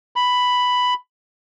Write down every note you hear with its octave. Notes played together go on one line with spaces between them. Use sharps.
B5